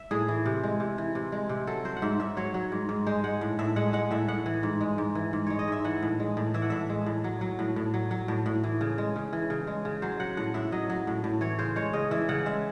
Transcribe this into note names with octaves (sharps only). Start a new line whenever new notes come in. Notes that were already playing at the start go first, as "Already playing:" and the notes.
Already playing: E5
A2 G#4
E3
C3
G#3
C3
E3
C3
G#3
C3
F#3 A4
F#3 C5
F#5
G#2 E5
G#2 E5
F#3 C#5
F#3
G#2
G#2
G#3 C5
G#3 F#5
A2
A2 E5
G#3 F#5
G#3 F#5
A2 E5
A2 F#5
E3
G#2
G#3
G#2
E3
G#2
G#3 C#5
D#5
G#2 E5
E3 F#5
A2
G#3
A2
E3 E5
F#5
A2 E5
G#3
A2
F#3
F#3
A2
A2
F#3
F#3
A2
A2
E3
C#3
G#3
C#3
E3
C#3
G#3
C#3
F#3 C5
F#3 F#5
A2 F#5
A2 E5
F#3 D#5
F#3
A2
A2
E3 C#5
C#3 C5
G#3 C#5
C#3 D#5
E3 E5
C#3 F#5
G#3 E5